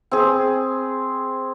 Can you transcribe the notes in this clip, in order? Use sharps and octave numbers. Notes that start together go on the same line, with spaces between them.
C4 G#4